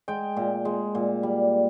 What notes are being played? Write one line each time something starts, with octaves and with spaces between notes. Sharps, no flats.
G#3 G5
A#2
G#3
A#2
G3